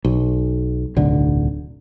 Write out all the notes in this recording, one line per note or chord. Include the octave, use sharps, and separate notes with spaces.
B1
D1 B1 D3